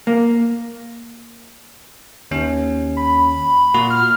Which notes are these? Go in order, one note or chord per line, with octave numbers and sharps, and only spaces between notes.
A#3
D#2 C#4
B5
A#2 F#4
F6